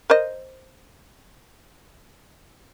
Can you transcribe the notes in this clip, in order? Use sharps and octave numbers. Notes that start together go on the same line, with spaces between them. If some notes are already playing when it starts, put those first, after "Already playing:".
A#4 C5 D#5